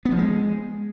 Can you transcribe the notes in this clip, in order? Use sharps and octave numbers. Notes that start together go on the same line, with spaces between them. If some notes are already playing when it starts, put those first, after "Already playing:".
B3
F3
G#3